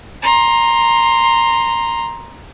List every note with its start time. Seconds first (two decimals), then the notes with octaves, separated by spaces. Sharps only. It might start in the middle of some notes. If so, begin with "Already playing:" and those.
0.22 A#5 C6